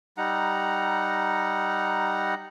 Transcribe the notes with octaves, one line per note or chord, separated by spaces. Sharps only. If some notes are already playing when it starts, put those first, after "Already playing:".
G3 D#4 F#5 A#5